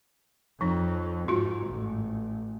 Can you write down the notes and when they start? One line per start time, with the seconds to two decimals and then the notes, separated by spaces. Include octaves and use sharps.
0.61 F2 F3 D#4
1.28 G#2 F4 F#4
1.67 A1